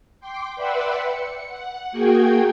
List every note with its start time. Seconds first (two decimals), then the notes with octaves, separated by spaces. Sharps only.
0.20 G5 C6 D6
0.56 B4 D5 E5 F#5 G5 C6
1.01 C#7
1.48 F#5
1.92 A#3 F#4 G#4 G5 G#6